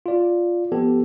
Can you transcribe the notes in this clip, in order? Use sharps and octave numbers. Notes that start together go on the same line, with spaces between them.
F4 D5
F3 B3 G4 A4